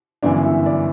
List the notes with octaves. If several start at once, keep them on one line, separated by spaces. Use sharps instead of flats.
G1 F#2 E3 D4
E4
D5